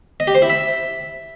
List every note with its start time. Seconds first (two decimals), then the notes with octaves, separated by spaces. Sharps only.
0.20 D#5
0.27 G4
0.35 C5
0.42 E4
0.50 E5